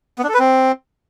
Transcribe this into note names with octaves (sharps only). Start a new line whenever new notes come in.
B3
D4
A4
B4
C4